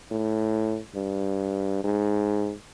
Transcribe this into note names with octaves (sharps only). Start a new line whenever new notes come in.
A2
G2
G#2